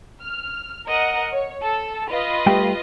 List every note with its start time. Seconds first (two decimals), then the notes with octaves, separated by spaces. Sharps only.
0.22 F6
0.86 A#4 D#5 F#5
1.32 C#5
1.62 A4
2.10 F4 B4 D#5
2.46 G3 A3 G5